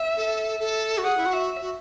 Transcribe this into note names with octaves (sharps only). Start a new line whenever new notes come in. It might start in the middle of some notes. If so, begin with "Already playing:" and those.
Already playing: E5
A4
A4
F#4
G#4 F#5
E4
F#4
E5
F#4